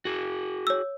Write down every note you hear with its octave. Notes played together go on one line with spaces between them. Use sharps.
F#4 G#4
C#5 E6